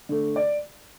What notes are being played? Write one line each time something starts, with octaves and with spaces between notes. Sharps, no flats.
D3 A3
D5